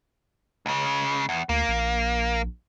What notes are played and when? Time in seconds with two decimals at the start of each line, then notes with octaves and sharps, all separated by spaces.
0.66 C#2 C#3
1.29 E2
1.49 D2 A#3
1.68 A#1